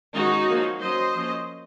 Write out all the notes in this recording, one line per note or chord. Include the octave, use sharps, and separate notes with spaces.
D#3 G#3 C#4 D#4 F#4
F3 A#3 C#4
F#3 C#4 C5 D#5
F3 A#3 C#4